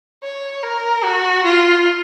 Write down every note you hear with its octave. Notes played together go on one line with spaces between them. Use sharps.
C#5
A#4
F#4
F4